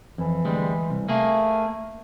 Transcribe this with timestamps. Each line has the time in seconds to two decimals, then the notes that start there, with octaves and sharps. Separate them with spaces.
0.18 F2 E3
0.45 D2 G3 G#3
0.90 C2
1.09 A3 A#3 G#4